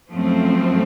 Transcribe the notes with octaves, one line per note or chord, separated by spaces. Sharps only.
F#2 F3 A3 C4